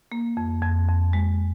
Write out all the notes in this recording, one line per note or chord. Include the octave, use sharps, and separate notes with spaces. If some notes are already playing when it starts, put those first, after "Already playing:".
A#3
F2
F2
F2
G#3